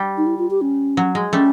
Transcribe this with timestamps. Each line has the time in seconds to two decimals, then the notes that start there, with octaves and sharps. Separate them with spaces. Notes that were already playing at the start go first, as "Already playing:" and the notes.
Already playing: G3
0.18 D#4
0.26 E4
0.38 F4
0.51 G4
0.61 C#4
0.97 F#3
1.15 G#3
1.33 G3 A3 C#4